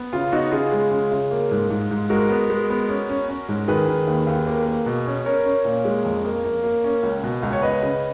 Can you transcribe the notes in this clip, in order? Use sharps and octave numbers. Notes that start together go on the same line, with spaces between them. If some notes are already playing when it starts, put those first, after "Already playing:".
Already playing: B3
C#3 F4
B3 D#4 F#4
C#3 F4 G#4
G#3
C#3
C#3
A#3
G#2
G#2
G#2
G#3 F#4 A#4
B3
G#3
B3
C#4
C#4
C#4
G#2
D#3 G#4 B4
D#3
D#2
D#2
A#3
A#3
B2
C#4
C#4 A#4 C#5
C#4
A#2
G#3
F2
A#3
A#3
A#3
C#4
C#2
B2
C#2
C#5
C#2 B4 D#5
C#3